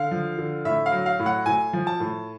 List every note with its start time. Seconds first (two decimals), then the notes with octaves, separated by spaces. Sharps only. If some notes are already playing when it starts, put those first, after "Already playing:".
Already playing: D3 F5
0.11 F3
0.38 D3
0.65 A2 E5
0.86 F5
0.92 F#3
1.06 F5
1.20 A2
1.26 F#5
1.46 A2 G#5
1.73 F3
1.87 A5
2.00 A2